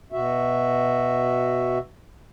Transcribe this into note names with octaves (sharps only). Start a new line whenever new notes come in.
B2 F#4 E5